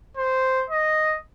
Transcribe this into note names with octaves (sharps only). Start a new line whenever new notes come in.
C5
D#5